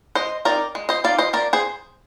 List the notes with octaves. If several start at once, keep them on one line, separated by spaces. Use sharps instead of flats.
G#3 C5 D#5
C4 D#4 A#4 D5
G#3
C5 D#5
C4 D#4 D5 F5
C5 D#5
F3 A#4 D5
G#4 C5